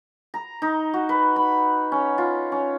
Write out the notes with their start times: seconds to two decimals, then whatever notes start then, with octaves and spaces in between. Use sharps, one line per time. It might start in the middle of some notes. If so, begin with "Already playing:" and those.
0.34 A#5
0.62 D#4
0.94 F#4
1.09 B4
1.36 B5
1.92 C#4
2.18 F4
2.52 C#4